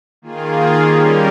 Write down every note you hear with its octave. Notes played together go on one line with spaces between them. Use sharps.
D#3 A#3 F4 G#4
G3 A#3 C#4 G4 A#4